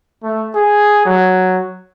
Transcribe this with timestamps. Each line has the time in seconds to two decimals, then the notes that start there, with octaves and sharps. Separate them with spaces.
0.23 A3
0.54 G#4
1.05 F#3